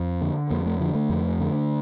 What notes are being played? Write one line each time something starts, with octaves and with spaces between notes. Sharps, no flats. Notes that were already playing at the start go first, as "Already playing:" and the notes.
Already playing: F2
D3
F2 A#3
A3
D3 F3
A3
F2
D3